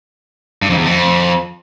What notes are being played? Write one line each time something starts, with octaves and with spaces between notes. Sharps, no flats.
G2
F2
E2
F2